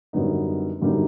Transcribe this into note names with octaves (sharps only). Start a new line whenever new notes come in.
F#2 D3 G3 B3 D#4
F#2 D3 G3 B3 D#4